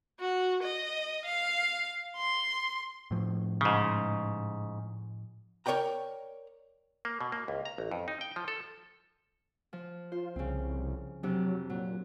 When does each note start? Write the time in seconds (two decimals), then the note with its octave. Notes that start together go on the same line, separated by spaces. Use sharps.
0.20 F#4
0.63 D#5
1.25 F5
2.17 C6
3.11 A2 F3
3.61 G#2 C#3
5.66 A#4 C#5 D5 G5 A#5
7.05 A#3
7.21 B2
7.32 A#3
7.48 C#2
7.65 A#5
7.78 A1
7.91 F2
8.08 D#4
8.21 G5
8.36 F3
8.48 A4
9.73 F3
10.12 F4 C5
10.36 C2 C#3 C4
11.23 F2 C3 F#3 D4
11.70 A#2 F#3